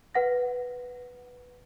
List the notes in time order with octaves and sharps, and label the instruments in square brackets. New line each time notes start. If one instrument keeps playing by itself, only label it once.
[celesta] B4 F#5 A#6